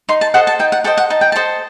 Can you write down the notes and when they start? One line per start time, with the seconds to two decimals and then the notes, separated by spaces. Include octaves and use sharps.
0.09 D#4 C6
0.21 A5
0.34 A4 C5 D#5 F#5
0.47 A5
0.59 D#4 G5
0.72 F#5
0.84 A4 C5 D#5 G5
0.97 F#5
1.10 D#4 A5
1.21 G5
1.32 A4 C5 D#5 A5